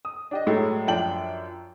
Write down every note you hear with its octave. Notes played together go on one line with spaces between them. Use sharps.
D#6
D4 G4 D#5
A2 F#3 G#3 A3
F#2 F3 D4 G5 A5 F#7